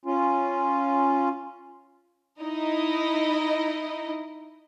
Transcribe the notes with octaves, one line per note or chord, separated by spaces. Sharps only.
C#4 F4
D#4 E4 D#5